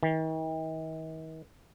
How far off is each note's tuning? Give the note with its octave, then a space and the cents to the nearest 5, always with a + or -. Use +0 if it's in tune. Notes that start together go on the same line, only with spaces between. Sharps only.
D#3 +45